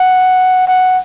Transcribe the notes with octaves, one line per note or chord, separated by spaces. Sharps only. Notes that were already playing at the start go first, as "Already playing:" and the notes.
Already playing: F#5
F#5